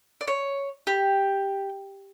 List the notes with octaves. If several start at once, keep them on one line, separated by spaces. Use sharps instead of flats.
D5
C#5
G4